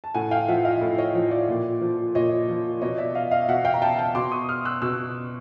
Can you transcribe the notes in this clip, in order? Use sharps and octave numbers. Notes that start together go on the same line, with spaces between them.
A5
A2 F#5 G#5
F5 G5
F3 E5 F#5
D#5 F5
A2
C#5 D#5
F3
D5
A#2
F3
A#2 C#5 D#5
F3
B2 C#5 D#5
D5 E5
D#5 F5
D#5 F5
B2 E5 F#5
F5 G5
A#5
G5 A5
G5 A5
B2 C6 D6
C#6 D#6
D#6 F6
E6 F#6
B2 E6 F#6